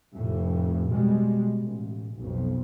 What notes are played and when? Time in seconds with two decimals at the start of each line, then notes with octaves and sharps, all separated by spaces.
0.15 F1 F2 A2
0.91 B2 G3 G#3
1.62 A1
2.18 B1 F2